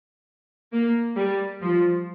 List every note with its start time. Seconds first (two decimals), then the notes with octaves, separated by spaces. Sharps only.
0.73 A#3
1.17 G3
1.62 F3